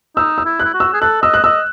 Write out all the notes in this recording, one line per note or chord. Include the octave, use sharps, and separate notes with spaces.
D#4 E6
E6
E4
F#6
E4
F#4
E6
G#4
A4 F#6
D#5 E6
F#6
D#5 E6